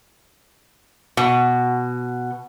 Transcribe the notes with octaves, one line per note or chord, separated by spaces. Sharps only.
B2